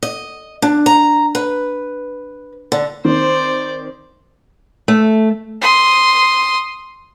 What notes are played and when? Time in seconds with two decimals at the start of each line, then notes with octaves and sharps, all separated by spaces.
0.03 D#5
0.62 D4
0.86 A#5
1.35 B4
2.72 D3
3.05 D#3 C4 C5 D5
4.88 A3
5.61 C6 D#6